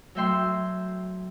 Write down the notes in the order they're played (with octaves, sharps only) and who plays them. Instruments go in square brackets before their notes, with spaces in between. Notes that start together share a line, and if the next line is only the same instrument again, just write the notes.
[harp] F#3 A3 E5 G5 C6